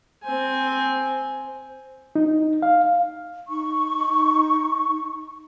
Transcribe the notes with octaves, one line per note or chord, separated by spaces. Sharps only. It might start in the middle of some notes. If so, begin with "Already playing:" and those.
C4 G#5
D#4
F5
D#4 C#6